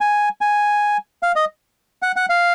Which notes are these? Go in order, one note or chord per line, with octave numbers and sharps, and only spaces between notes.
G#5
G#5
F5
D#5
F#5
F#5
F5